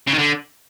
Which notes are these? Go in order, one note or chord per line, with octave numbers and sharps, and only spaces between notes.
C#3
D#3
D3